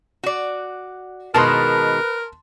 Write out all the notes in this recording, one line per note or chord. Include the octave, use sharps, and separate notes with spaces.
F#4 D5
B2 D#3 G#3 A#4 B4 A5 C6